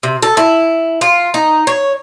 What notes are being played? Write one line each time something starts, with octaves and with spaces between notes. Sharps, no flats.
C3
A4
E4
F4
D#4
C#5